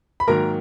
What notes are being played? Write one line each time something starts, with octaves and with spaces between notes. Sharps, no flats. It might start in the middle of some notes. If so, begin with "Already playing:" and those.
B5
G#2 D#3 F#3 A#3 A#4 A#5